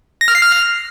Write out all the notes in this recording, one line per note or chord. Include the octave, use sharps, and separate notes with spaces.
A#6
F6
C7
F6